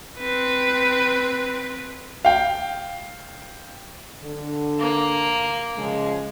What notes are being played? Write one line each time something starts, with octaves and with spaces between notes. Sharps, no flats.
C4 B4
F5 G5
D3
A#3
C#3 F3 G#3